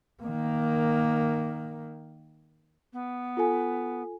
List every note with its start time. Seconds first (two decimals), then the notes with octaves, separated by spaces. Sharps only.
0.23 D#3 A#3
2.93 B3
3.37 F4 A4 G#5